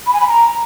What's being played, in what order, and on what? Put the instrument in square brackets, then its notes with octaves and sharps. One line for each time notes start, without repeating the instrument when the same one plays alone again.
[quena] B5
G#5
B5
A#5